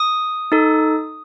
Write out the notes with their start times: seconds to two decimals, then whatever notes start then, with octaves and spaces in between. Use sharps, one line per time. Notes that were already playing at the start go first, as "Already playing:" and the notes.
Already playing: D#6
0.52 D#4 A4